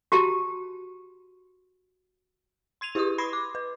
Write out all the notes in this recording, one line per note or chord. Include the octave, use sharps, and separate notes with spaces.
F#4 G4 A5 A#5
C6 G#6 D#7 F7
E4 G4 B4 C#6 D#6
B5 C6 G#6 A#6 C7
D6
B4